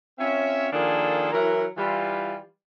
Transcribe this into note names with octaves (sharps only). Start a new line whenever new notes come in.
C4 C#4 F4 C#5 E5
D#3 F3 A#3 D4 G#4 A4
E3 F#3 E4 A#4
E3 G3 F4